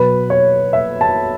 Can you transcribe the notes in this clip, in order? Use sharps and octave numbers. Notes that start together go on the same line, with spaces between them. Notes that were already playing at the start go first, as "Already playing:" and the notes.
Already playing: B2 F#3 B3 B4
C#5
E5
A5